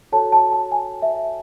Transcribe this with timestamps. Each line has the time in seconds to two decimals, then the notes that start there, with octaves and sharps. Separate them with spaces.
0.12 F#4 A4 C#5 A5
0.32 A5
0.53 A5
0.72 G#5
1.02 E5